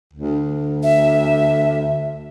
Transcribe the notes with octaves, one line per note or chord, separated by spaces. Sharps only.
D2
E5